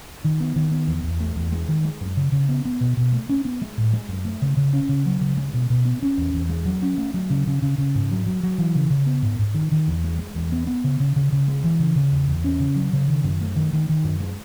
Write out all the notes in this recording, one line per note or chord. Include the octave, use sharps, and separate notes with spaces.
D#3
B3
D#3
B3
E2
E2
A3
E2
G#3
D#3
G#3
F#2
C#3
C#3
B3
B3
B2
B2
A3
C#4
B3
G#3
A2
G#3
F#2
A3
C#3
C#3
C#4
C#3
F#3
C#3
G#3
B2
B2
B3
C#4
E2
E2
G#3
F#3
C#4
A3
F#3
C#3
C#3
C#3
C#3
G#2
F#3
F#3
F#3
E3
C#3
C#3
B3
G#2
G#2
D#3
D#3
E2
G#3
G#3
E2
B3
B3
C#3
C#3
C#3
C#3
G#3
E3
C#3
C#3
E2
E2
C#4
C#3
F#3
C#3
D#3
F#2
A3
D#3
D#3
D#3
F#2
G#3